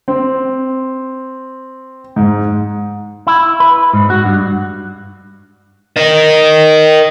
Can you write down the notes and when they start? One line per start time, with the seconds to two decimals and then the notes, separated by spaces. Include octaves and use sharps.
0.08 C4
2.16 G#2
3.27 E4
3.60 B4
3.93 G#2
4.10 F#4
4.25 G2
5.96 A#4 D#5